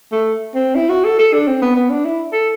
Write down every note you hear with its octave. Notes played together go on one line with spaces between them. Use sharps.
A3
C4
E4
F#4
A4
A4
D4
C4
B3
B3
D4
E4
A4